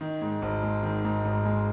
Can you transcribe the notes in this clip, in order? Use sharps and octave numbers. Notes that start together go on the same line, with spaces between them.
D#3
G#2
G#1
G#3
D#3
G#2
G#1
G#3